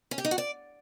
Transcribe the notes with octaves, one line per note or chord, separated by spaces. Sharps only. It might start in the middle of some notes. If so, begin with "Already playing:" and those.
C#4
G4
D#4
F#4
D5